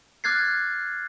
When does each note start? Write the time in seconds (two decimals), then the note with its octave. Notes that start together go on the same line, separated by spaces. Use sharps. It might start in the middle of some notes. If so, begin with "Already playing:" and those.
0.24 D6 F6 F#6 G#6 A6 C7